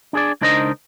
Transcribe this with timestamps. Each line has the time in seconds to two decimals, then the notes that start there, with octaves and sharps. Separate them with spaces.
0.13 D4 G#4 D5
0.41 C#2 D4 D#4 A#4 C5 D#5